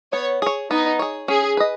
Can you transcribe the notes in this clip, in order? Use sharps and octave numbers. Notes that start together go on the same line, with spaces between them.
B3 C#5
G#4 C#5
B3 D#4
G#4 C#5
C#4 G#4
B4 D#5